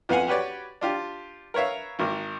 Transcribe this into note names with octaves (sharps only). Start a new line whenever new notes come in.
F2 B3 F5 F#5 G#5
F#4 G4 B4 C#5 D5
D4 F4 G4
A#4 B4 C#5 E5 F5
G#1 A#3